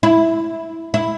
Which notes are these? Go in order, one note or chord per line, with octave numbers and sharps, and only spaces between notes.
E4
E4